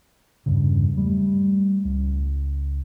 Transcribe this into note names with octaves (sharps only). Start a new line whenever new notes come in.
E2 G2 C#3
G3 A3
C#2